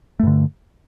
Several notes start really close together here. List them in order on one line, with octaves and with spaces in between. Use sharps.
A3 G2 D3